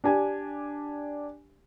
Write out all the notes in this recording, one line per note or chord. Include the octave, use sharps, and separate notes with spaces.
D4 G4 G#5